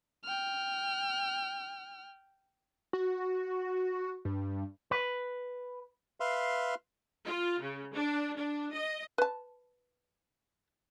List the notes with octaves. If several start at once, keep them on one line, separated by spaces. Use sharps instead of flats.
G5 F6
F#4
G2
B4
B4 E5 F5 C6
F4
C#3
D4
D4
D#5
B4 A5